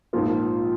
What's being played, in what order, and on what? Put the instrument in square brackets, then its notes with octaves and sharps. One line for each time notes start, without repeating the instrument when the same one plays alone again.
[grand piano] A#1 G#2 F3 A#3 [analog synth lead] F4